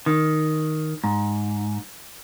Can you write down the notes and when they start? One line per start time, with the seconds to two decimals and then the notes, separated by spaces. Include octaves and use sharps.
0.06 D#3
1.04 G#2